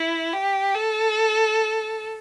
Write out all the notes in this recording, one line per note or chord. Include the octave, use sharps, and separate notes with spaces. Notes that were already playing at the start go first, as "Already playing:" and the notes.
Already playing: E4
G4
A4